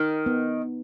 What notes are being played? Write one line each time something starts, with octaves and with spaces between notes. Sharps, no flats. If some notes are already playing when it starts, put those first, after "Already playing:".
Already playing: D#3 D#4
B3